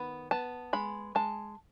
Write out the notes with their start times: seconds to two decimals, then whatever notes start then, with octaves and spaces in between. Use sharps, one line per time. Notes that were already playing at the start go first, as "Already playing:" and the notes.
Already playing: D#3 B3 B5
0.31 B3 A5
0.73 G#3 B5
1.15 G#3 A5